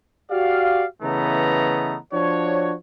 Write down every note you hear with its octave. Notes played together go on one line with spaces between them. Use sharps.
F#4 G4 D5 F5
C#3 E3 A3 B3 D#5 A#5
F3 D4 F#4 C#5